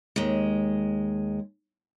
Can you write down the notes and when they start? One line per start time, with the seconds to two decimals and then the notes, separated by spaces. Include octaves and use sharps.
0.16 D#2 G#3